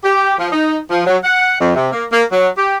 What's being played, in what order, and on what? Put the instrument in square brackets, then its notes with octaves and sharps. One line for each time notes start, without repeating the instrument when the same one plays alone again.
[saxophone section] G4
F3
D#4
F3
F#3
F#5
F2
C3
A#3
A#3
F#3
G4